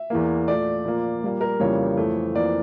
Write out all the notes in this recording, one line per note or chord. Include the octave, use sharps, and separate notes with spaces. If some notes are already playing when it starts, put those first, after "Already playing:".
Already playing: E5
E2 E3 A#3
A#2 A3 D5
A#2 F3 A#3
A#2 G3 A#3
A#4
F2 C#3 E3 G3 A#3 C#5
F2 E3 A3
F2 E3 A#3 D5